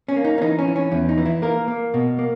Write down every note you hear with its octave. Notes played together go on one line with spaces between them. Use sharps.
C#4
A#3
D#4
C#4
E3 D#4
C#4
E3
C#4
E2 C#4
D#4
E3
E4
A#3 A#4
A#3
B2
A#3